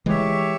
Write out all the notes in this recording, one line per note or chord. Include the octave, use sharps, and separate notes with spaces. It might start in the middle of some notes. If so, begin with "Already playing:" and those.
E3 G#3 G4 C#5 E5